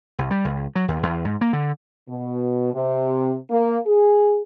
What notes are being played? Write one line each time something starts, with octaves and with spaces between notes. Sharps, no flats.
C2
G3
C#2
F#3
D#2
E2
G#2
A#3
D3
B2
C3
A#3
G#4